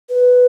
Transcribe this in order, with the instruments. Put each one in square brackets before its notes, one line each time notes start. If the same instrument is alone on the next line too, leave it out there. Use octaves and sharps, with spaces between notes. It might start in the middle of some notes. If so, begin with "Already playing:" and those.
[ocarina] B4